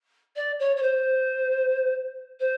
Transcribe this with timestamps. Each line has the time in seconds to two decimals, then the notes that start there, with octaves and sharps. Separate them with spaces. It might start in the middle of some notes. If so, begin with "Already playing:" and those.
0.36 D5
0.60 C#5
0.77 C#5
0.82 C5
2.40 C5